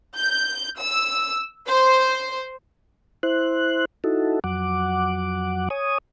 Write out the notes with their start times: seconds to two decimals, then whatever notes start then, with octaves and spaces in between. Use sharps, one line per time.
0.16 G6
0.79 E6
1.67 C5
3.23 E4 C5 F#6
4.04 D#4 E4 F#4 A4
4.44 F2 F#3 F#5 D6
5.70 C#5 G#5 D#6